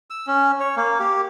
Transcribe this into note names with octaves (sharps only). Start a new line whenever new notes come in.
E6
C#4
C#5
A#3
G4